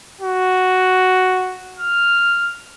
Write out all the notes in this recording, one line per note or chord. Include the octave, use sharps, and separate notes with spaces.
F#4
F6